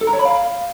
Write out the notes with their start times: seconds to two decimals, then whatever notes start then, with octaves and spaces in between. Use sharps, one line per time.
0.01 A4
0.07 A#5
0.13 C#5
0.19 B5
0.25 F5